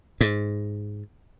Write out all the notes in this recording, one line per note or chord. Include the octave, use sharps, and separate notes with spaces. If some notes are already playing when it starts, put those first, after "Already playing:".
G#2